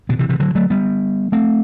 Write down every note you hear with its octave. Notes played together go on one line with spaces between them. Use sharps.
B2 D3
C3 E3
C3 E3
D3 F#3
F#3 A3
G3 B3
A3 C4